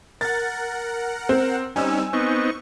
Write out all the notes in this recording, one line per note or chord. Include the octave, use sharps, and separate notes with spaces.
A#4 F#5 A6
C4
G3 C4 C#4 D#4 G#5 E6
B3 C4 D#4 C#6